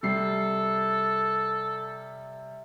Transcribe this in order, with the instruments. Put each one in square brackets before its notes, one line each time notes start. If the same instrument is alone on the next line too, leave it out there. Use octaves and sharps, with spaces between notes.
[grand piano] C3 G3 C7 [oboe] A4